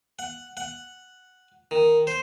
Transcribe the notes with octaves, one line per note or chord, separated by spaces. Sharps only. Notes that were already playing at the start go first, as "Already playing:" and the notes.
F#5
F#5
D#3
C5